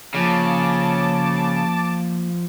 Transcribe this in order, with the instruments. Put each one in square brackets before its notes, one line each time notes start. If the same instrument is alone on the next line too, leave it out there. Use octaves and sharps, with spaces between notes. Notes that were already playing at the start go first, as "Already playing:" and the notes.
[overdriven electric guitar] C#3 [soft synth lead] F3 [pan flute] A#3 [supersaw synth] A5 D6